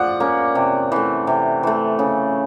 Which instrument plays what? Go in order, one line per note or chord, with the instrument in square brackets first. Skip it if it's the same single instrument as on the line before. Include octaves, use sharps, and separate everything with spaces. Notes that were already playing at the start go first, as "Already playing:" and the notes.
Already playing: [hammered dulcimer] F3 [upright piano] D5 F#5
[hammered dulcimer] A#3 C#4
C3
E3 A3
C3
E3 A3
C#3